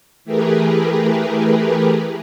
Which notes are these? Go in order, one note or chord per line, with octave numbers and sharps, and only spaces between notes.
E3 A3 G4 G#4 A#4 B4